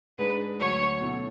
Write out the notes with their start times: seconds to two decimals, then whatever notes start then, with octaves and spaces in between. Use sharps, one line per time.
0.18 G#2 G#3 D4 G#4 B4
0.59 D2 D3 F#3 C#5
1.00 B1 B2 A3 C#4 E4